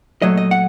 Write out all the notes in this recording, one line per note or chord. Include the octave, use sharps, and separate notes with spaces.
A#2 F#3 A3 D#5
D#5
F#5